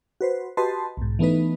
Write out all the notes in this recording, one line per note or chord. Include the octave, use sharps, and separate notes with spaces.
F#4 B4 C5
F#4 G4 B4 D#5 A5 C6
B1 G#2
E3 A3 B3 D#4 B4